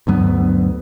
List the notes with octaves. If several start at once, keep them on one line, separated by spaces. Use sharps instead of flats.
D2 G2 F#3 B3